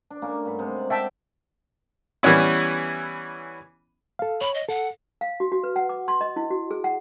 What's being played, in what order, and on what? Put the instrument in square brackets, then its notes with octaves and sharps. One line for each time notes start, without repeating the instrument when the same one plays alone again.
[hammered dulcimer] D4
A3 A#3 C#4
G2 F#5 B5
C3 G#3
D5
[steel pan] E5 G5 A5 [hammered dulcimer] F#5
[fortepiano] E3 G3 B3 C#4 E4
[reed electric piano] A4 F5
[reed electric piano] C#5 [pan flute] B5
[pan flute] D#5
[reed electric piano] A4 [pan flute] F#5
[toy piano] F5
F#4
F#4
B4
F#5
D6
C6
D#5
E4
F#4
G#4
F#5